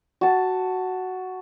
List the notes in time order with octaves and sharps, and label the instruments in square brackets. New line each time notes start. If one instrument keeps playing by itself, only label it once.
[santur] F#4 A5